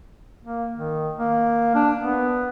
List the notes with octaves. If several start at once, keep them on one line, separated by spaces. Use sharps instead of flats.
A#3
D#3
A#3
D4
B3